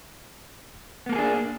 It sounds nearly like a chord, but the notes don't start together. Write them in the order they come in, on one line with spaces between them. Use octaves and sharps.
B3 A#3 A4 G#4 D4